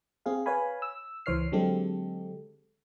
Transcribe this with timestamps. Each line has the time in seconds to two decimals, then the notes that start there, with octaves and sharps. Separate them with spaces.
0.26 C4 G#4 F5
0.46 B4 C#5 F5 G#5 B5
0.82 E6
1.26 C#2 E3 C5 C#5 F6 C7
1.52 D3 F#3 G#3 C4 G4 A4